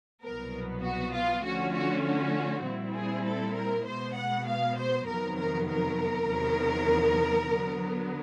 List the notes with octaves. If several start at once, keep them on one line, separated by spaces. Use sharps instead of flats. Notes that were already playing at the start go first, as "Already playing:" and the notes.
C2 B2 F#3 B3 A#4
F#4
F4
D3 F3 A3 C#4 F4 F#4
F#4
F#4
A#2 G3 C4 E4
G#4
A4
A#4
B2 G#3 B3 C5
F#5
F5
C5
F2 C3 D#3 F#3 B3 A#4
A#4
A#4
E2 C3 D#3 F#3 B3
D3 F#3 B3